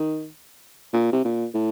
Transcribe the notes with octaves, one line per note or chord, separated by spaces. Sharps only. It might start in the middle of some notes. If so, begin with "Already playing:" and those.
Already playing: D#3
A#2
C3
A#2
A2